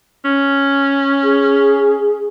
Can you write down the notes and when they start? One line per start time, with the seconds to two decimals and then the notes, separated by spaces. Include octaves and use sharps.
0.25 C#4
1.24 G#4